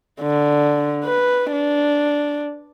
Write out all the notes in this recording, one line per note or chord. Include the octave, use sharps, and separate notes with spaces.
D3
B4
D4